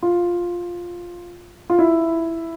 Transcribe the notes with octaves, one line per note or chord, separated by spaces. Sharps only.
F4
F4
E4